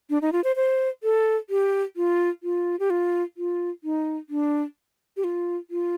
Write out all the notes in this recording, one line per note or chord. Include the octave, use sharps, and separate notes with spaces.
D4
D#4
F4
C5
C5
A4
G4
F4
F4
G4
F4
F4
D#4
D4
G4
F4
F4